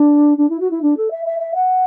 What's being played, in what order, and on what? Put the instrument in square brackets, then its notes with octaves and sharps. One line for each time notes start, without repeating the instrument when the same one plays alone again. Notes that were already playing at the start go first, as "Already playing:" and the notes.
Already playing: [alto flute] D4
D4
E4
F#4
E4
D4
A4
E5
E5
E5
F#5